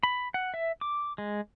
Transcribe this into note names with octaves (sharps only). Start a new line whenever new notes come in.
B5
F#5
E5
D6
G#3